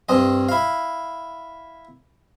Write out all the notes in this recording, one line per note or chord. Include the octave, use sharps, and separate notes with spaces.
G2 C4 D#5
E4 F5